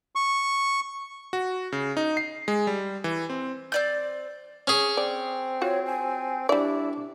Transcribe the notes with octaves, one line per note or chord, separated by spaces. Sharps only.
C#6
F#4
C#3
D#4
C7
G#3
G3
E3
C4
C4 D5 G6
C#4 G#4
C4 D5
F4 F#4 C#5
G#5
G3 D4 E4 D5